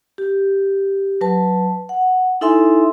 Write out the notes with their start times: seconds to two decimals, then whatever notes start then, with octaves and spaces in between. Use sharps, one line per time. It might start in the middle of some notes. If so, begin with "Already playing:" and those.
0.18 G4
1.21 F#3 B4 A5
1.89 F#5
2.41 D#4 E4 A4 E5 G#5 C6